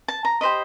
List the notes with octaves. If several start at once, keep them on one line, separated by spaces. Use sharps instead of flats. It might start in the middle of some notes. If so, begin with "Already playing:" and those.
A5
A#5
G4 C5 D#5 B5